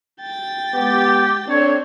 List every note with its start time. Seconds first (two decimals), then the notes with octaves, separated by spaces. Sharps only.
0.21 G5 A6
0.74 G#3 B3 G4
1.48 C4 D4 A4 C#5